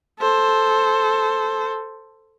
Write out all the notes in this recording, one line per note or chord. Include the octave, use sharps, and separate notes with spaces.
A4 C5